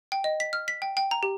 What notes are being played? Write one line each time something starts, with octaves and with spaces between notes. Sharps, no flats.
G5
D#5
B6
F6
B6
G5
G5
A#5
G4